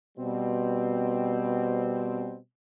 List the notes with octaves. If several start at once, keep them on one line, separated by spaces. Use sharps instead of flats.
B2 G3 C4